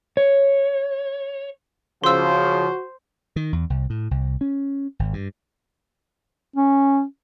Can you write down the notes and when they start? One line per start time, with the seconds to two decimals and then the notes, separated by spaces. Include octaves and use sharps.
0.17 C#5
2.04 C#3 F3 F#4 C5 C6 E6
3.36 D#3
3.53 E2
3.70 C2
3.90 A2
4.11 C2
4.41 C#4
4.99 G#1
5.13 G2
6.56 C#4